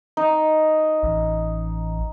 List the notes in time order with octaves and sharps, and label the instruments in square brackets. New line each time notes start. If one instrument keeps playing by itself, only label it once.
[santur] D#4
[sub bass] A1